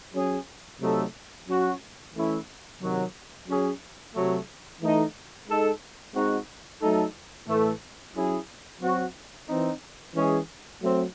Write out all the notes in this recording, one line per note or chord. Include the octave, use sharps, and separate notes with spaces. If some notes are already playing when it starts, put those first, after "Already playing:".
F#3 C#4 G#4
C3 F#3 A3 D#4 A4
F#3 C#4 F#4
E3 A3 C#4 E4
C3 D#3 F#3
F#3 C#4 G#4
C3 F#3 A3
E3 A3 D#4 A4
G#3 D#4 A4
G#3 C4 D#4 F#4
F#3 A3 D#4 A4
A2 E3 A3
F#3 C#4 E4 G#4
F#3 C4 F#4
E3 C4 D#4
E3 G#3 C#4 G#4
F#3 A3 C4